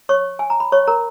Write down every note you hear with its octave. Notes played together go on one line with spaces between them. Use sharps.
C#5 C#6
G#5
A#5
B5
C#5 C#6
A#4 A#5